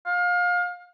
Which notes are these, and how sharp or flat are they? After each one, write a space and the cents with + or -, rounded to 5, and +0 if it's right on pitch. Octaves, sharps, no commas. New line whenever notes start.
F5 +30